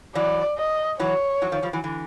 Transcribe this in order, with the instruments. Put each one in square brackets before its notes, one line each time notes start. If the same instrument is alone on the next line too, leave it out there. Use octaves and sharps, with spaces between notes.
[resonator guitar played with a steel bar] E3 F#3 [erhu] D5
[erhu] D#5
[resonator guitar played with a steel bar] E3 F#3 [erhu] C#5
[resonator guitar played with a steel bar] E3 F#3
D#3 F3
F3 G3
E3 F#3
D3 E3